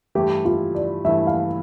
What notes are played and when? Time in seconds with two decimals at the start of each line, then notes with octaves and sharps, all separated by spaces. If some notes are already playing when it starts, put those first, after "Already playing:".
0.15 G2 E3 A3 E4 G4
0.45 F4
0.75 D5
1.05 G2 E3 A3 E4 E5
1.27 F5